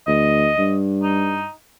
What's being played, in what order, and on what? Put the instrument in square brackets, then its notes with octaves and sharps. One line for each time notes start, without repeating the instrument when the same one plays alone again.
[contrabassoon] D2 [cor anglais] D#5
[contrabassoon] G2
[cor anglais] D#4